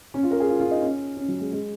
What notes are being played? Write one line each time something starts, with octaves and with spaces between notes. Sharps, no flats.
C#4
F4
A#4
G#4
F4
F4
D#4
C#4
C#4
F#3
G#3
G#3